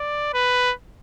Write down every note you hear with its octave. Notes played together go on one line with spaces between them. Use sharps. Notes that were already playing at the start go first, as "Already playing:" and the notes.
Already playing: D5
B4